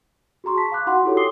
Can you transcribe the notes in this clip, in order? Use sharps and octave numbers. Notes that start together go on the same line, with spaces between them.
F#4 G#4 A#5 C6 C#6
A5 B6
F5 B5 D6 F#6
D#4 F#4 F#5 B5 C6
E4 F#4 G4 A4 C#5
G5 C6 D6 D#6 C7 G7